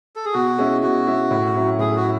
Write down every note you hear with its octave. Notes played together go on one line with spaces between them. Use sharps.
A4
G#4
B2 F#4
G#3 C#4 E4
B2 F#4
G#3 C#4 E4
A2
F#3 C#4 E4
A2 G#4
F#4
E4